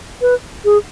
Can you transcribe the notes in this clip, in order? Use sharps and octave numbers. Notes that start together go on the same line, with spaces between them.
B4
G#4